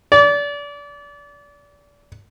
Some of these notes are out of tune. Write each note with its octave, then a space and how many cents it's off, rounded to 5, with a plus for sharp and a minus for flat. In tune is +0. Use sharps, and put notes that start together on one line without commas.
D5 -30